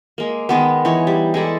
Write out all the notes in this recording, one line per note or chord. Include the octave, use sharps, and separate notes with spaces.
G#3 A#3
D#3 G#3 B3
E3 D#4 C#5
G3
G#3 E4 A4 D5